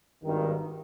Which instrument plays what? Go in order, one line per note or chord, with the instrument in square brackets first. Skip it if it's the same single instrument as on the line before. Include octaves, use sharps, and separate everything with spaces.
[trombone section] G#1 G2 D#3